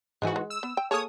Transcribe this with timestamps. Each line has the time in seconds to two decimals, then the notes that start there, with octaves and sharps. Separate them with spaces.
0.22 G#2 E3 G#3 D#4 F#4 G#5
0.36 G#3
0.50 E6
0.63 B3
0.77 G5
0.91 A#3 G#4 A4 C#5 D#6